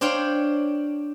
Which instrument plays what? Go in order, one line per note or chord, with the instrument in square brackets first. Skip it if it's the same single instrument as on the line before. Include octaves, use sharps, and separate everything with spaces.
[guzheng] D4 C5 C#5 F5 G5